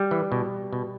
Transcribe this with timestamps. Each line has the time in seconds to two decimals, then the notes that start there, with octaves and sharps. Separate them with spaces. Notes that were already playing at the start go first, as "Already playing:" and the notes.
Already playing: G3
0.11 E3
0.32 B2
0.73 B2